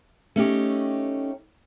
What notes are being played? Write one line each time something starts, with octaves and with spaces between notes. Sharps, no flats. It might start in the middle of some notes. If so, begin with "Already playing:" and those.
A3 C#4 D#4 G4